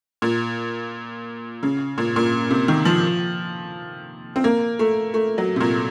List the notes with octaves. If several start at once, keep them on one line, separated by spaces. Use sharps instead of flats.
A#2
C#3
A#2
A#2
C3
D#3
F3
C4
A#3
A3
A3
F#3
C3
A#2